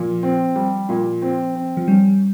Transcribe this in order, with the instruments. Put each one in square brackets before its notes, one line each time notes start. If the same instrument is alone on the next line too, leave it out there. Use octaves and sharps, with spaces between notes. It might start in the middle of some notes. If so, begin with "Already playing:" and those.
Already playing: [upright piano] A#2 [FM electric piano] F3
[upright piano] C4
G3
A#2
C4
C4
[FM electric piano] F3
[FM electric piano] G3 [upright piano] C#4